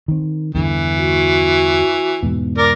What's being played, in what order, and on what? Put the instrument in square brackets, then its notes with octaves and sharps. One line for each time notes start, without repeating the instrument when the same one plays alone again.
[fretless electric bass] D#3 C4
[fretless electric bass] E2 G2 D3 [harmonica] E3
[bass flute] F#4
[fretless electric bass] E2 G#2 B2
[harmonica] A#4 D5